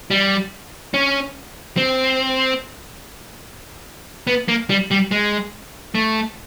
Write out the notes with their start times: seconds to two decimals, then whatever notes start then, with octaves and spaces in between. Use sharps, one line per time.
0.11 G3
0.94 C#4
1.77 C4
4.27 B3
4.48 A#3
4.70 G3
4.91 G3
5.11 G#3
5.95 A3